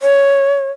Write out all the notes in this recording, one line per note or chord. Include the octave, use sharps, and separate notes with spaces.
C#5